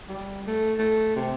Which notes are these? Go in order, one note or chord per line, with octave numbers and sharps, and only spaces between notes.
G3
A3
A3
C3